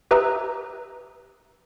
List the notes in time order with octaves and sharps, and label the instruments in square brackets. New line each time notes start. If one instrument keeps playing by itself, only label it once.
[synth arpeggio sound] G4 B4 E5 A#5 D#6 E6